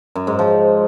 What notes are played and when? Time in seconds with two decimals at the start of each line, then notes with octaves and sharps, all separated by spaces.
0.15 F#2
0.27 G#2
0.39 F3